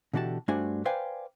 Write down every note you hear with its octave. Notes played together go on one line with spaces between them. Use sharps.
B2 D3 E3 F#4 G4 A5
G2 A3 D4 F#4 C5 G#5
B4 C5 D5 F5 G5 G#5